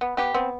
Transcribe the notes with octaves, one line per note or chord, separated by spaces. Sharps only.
B3
B3 G4
B3 C4